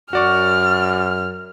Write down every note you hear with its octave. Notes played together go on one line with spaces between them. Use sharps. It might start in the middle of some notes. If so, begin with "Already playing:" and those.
F#2 F#4 D5 C#6 F6